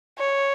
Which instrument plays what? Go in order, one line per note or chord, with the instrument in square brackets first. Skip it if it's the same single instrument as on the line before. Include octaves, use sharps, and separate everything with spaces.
[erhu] C#5